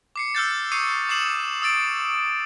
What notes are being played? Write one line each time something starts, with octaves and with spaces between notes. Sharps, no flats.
D6 C7 C#7
E6 F6 G6 A6
C#6 D#6 G6 C7 C#7 D#7
D6 C7 C#7 E7 F#7
D#6 E6 A6 D7